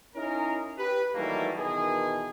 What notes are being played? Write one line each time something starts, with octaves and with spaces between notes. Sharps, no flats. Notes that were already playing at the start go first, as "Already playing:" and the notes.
C#4 D#4 E4 G#4 A#4
G4 B4
D#3 E3 F#3 G3 A3 A#3
B2 D#3 E3 G#4